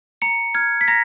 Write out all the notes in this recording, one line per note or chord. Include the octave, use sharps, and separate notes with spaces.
A#5 C#7
F6 G#6
B6
A#5 A#6